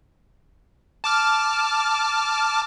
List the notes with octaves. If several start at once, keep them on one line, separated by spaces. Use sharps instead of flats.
A5 D6 F6